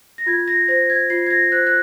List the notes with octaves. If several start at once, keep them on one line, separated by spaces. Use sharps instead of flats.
A#6
F4 G#6
A#6
C5 A#6
G#6
F4 C7
G#6
A#6
C5 F#6
F#6